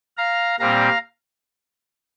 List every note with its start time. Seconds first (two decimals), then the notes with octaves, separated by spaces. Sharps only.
0.17 F5 A#5
0.59 A#2 G3 C4 F5 A#5